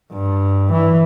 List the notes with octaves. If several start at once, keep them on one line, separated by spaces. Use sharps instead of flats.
G2
E3